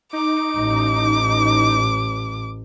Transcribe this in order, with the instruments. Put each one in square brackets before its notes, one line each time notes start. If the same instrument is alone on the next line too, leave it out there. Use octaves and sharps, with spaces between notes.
[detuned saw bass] D#4 [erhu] D6
[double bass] A1